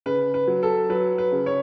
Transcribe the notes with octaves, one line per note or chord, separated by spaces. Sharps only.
C#3 B4
B4
F#3
A4
F#3 B4
B4
C#3
C#5